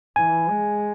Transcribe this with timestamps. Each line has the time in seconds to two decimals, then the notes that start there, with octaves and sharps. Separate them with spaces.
0.16 E3 G#5
0.50 G#3